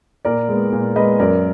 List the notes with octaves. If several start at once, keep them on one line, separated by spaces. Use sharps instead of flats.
A#2 A#4 D5
G#3 B3
A#2
G#3 B3 B4 D#5
F#2 A#4 D5